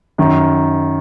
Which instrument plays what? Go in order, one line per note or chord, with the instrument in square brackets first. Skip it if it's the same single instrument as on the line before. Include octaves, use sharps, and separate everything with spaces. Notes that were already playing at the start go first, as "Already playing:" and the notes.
[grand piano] F#2 D#3